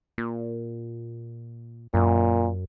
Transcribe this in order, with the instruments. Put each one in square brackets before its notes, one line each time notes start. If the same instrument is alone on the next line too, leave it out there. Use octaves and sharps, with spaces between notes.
[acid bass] A#2
[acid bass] F#2 [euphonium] A#2